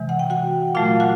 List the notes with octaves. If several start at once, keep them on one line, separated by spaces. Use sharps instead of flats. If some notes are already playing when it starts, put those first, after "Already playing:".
Already playing: C3 E3 G#3
F#5
G5
F#4 F#5
A#2 F#3 A3 F4 F5
F#4 F#5